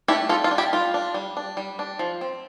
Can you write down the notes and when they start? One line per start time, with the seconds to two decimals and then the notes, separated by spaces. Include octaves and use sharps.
0.08 A3 D4 E4 G4
0.29 G3 F4 A4
0.44 F4
0.51 D4
0.58 E4 G4
0.73 G3 F4
0.94 D4
1.14 G3
1.37 D4
1.57 G3
1.79 D4
1.99 F3
2.21 C4